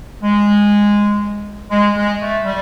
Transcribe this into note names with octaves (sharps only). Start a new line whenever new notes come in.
G#3
G#3
G#3
A3
G3